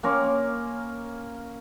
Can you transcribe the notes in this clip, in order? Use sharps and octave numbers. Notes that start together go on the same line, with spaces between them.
A#3 C#4 A#4 C6